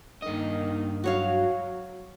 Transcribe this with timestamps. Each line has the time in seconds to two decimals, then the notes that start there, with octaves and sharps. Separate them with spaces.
0.22 G2 D#3 A#3 D#5
1.04 F#3 F#4 C#5 F5